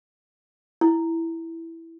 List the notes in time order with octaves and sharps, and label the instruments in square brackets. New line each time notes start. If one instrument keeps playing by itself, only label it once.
[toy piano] E4